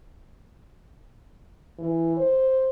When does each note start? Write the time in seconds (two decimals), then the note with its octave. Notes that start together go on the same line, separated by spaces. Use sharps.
1.79 E3
2.17 C5